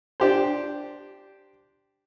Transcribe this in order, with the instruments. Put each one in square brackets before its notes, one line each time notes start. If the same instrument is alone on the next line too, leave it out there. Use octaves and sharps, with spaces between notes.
[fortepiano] D4 G4 C5